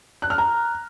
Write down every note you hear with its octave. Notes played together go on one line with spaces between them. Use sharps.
F#6
F6
A#5